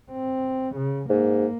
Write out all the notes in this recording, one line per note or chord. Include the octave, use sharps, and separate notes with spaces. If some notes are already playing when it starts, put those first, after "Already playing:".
C4
C#3
G#2 A#3